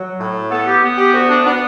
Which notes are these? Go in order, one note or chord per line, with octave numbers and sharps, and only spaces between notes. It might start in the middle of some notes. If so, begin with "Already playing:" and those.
Already playing: F#3
A2
B3 A4
G4
B3
G4
D2 F#4
D4
B3 D4